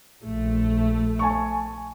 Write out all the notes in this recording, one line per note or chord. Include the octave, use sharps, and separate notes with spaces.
A#1 A3
G#5 A5 C#6